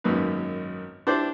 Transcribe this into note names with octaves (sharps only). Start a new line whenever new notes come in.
G#1 F#2 A#3 D#4 B4
D4 E4 G4 C5 D5